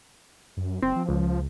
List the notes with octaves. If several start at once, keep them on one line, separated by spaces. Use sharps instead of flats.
F#2
F#1 C4
F3
C#2